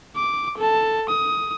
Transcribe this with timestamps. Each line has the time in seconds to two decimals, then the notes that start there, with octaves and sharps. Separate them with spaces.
0.16 D6
0.57 A4 A5
1.08 D#6